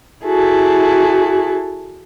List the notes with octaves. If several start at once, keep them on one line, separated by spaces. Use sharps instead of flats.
E4 F#4 G#4 A4